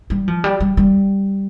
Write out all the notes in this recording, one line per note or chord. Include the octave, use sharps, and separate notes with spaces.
G3
F3
G3
G3
G3